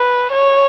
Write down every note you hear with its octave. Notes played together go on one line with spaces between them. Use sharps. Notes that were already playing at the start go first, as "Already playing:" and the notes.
Already playing: B4
C#5